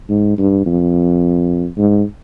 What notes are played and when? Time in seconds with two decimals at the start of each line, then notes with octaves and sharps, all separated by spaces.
0.09 G#2
0.38 G2
0.66 F2
1.78 G#2